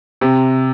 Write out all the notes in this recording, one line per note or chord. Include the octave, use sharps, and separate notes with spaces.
C3